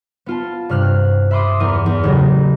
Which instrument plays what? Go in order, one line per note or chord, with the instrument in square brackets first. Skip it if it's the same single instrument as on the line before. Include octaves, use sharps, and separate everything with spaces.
[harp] B3 F4 A5
G2 C3 F6 F#6
E5 B5 C6 D6 D#6
E2 A#4 D#7
E2
A1 C#3 F#3 A#6